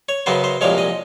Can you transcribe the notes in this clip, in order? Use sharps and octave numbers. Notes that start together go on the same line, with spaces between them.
C#5
F#2 C#3 F#3 B3 C5
C5
C2 A#2 F3 G#3 C#5
D#5